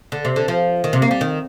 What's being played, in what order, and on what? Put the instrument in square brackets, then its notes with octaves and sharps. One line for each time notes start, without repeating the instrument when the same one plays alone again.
[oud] D3
C3
D3
F3
D#3
C3
A#3
G3
D#3